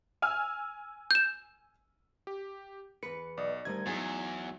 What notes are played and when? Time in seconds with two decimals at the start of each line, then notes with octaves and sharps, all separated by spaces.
0.22 G#5 E6 F6
1.11 G6 E7
2.27 G4
3.03 E2 B4 C#7
3.37 B1 D5 D#5
3.65 D2 D#3 G3 G#6
3.87 E2 F#3 D#4 G#4 G#5 D#7